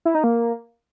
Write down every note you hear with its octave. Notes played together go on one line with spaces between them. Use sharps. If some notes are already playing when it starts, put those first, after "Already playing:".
E4
D#4
A#3